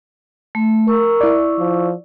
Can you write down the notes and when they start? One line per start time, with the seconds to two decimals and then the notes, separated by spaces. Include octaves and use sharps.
0.55 A3
0.88 A#4 C#6 E6
1.21 E4 D5
1.59 F3